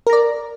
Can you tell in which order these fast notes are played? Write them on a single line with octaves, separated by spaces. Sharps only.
A#4 A#5 D5